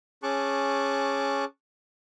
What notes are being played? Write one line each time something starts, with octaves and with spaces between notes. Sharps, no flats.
C#4 G#4 A5 C#6 D6 F#6